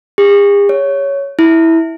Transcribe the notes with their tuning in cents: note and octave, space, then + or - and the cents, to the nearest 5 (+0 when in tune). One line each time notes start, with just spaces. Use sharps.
G#4 -45
C#5 +10
E4 -10